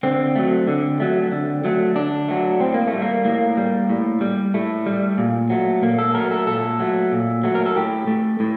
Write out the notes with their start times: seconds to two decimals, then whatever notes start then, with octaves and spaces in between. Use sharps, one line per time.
0.03 D3 C4
0.36 F#3 A3
0.67 D3
1.00 F#3 A3
1.32 D3
1.65 F#3 A3
1.96 D3 D4
2.28 F#3 A3
2.60 A2 C4
2.74 A#3
2.88 A3
2.93 G3
3.02 A#3
3.25 A2 A#3
3.57 G3
3.90 A2
4.21 G3
4.54 A2 A3
4.86 G3
5.18 A#2
5.50 F#3 A3
5.82 A#2 A#3
5.98 A4
6.14 F#3 A3 A#4
6.31 A4
6.47 A#2 A4
6.79 F#3 A3
7.12 A#2
7.44 F#3 A3
7.55 A#4
7.66 A4
7.76 A2 G4
8.07 A3
8.40 A2